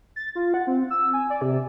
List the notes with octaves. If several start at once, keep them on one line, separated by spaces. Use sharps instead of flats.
A6
F4
F#5
C4
E6
G#5
D5
C3